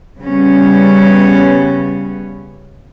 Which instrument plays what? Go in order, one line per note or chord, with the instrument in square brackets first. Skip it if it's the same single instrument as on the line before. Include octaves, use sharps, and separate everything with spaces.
[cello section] C#3 G3 B3 C#4